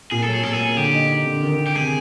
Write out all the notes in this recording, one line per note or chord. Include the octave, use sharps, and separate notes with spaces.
A#2 G#4
A4
F#3
G#4
A#2 A4
G#4
A#3
D3 G4
D#4
D#4
D3
D#3
D#3
G4
C3 G#4